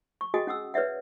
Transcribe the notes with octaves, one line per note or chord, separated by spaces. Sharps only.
C#6
F#4 G#4 D#5 G5 G#5 D#6
C#4 F#5 D#6 E6
B4 C#5 D5 E5 F#5